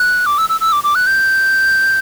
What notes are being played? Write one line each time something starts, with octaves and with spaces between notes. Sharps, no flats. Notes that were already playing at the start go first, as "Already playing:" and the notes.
Already playing: F#6
D6
E6
E6
E6
D6
D6
F#6
G6